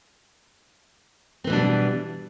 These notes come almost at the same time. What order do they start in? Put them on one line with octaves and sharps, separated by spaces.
C4 E3 B2 D4 G3